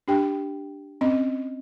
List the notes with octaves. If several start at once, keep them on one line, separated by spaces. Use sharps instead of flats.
D4 G4 G5
C4 C#4 D#5